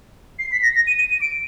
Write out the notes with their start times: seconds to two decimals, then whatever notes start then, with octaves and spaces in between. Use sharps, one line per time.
0.39 C7
0.52 B6
0.63 A#6
0.75 A#6
0.87 D#7
0.98 D#7
1.10 D#7
1.21 D7